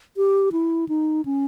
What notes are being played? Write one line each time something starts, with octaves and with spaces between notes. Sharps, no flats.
G4
E4
D#4
C#4